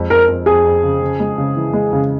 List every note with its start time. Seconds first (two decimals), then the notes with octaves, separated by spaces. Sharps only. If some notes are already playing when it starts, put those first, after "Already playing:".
Already playing: F2 G#3
0.10 F2 A#4
0.28 F2
0.46 F2 G#4
0.64 F2
0.84 C#3
1.02 C#3
1.20 G#3
1.38 C#3
1.56 E3
1.73 G#3
1.93 C#3